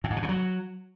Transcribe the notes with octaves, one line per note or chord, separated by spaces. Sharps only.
A2
G#2
B2
C3
F#3